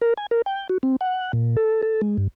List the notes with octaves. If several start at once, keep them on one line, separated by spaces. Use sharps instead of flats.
A#4
G#5
A#4
G5
F#4
C4
F#5
A#2
A4
A4
G#3
G2